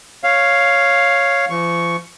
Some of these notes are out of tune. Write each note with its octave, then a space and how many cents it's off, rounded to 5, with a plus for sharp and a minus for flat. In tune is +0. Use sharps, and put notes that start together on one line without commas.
C#5 +0 F5 +0
F3 -40 C#6 +0